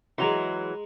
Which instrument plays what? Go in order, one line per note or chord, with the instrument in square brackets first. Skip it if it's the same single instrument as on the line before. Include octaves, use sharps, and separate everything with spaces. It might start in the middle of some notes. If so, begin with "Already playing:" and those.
[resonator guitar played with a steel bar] E3 F#3 [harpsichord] G#3 A#5 C6